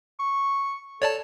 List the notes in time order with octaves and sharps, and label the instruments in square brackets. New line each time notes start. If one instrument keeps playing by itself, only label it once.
[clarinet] C#6
[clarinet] A4 [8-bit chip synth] C#5 D5 A5